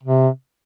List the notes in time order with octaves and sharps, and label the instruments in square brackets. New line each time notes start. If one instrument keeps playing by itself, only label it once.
[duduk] C3